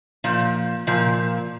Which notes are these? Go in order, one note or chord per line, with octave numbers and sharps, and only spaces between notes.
A#2 F3
A#2 F3